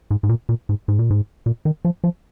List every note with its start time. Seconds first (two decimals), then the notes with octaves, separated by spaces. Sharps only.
0.11 G#2
0.23 G#2
0.29 A#2
0.49 A#2
0.69 G#2
0.88 G#2
0.99 A#2
1.10 G#2
1.46 A#2
1.65 D#3
1.85 F3
2.04 F3